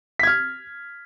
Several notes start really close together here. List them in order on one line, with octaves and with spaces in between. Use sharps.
B6 G#6 F6